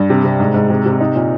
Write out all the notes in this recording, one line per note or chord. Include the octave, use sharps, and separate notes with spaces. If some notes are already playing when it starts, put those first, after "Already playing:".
Already playing: G2
C3
C3
G#2
G#2
C3
C3
D#4
A#2